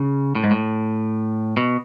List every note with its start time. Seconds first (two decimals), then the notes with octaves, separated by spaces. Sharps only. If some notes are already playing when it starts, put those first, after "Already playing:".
Already playing: C#3
0.35 A2
0.44 G#2
0.51 A2
1.57 B2